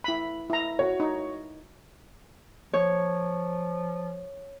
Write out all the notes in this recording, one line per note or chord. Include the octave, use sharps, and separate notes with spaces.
E4 B5
E4 A#5
F#4 C#5
D#4
F3 C#5